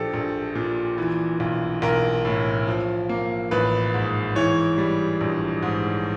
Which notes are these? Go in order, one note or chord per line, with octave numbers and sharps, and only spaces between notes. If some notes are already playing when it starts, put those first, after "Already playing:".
Already playing: A#1 F3 G4 A4
A#1
A#2
E3
B1
B1 A#4
A2
F3
A#3
A1 B4
G#2
E3 C#5
G3
A#1
G#2